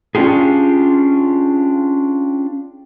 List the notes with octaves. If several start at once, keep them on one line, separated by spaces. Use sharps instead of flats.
C#4 D4 F4 G4 G#4